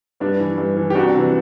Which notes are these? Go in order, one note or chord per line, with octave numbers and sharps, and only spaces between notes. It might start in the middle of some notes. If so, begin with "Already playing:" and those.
G2 B3 D4
E3
G2
E3
G4
C2 D4 F#4
C3 E3